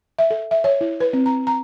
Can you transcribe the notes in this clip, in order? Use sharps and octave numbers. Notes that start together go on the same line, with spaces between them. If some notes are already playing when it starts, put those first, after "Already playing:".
E5
A4
E5
C#5
E4
B4
C4
A#5
A#5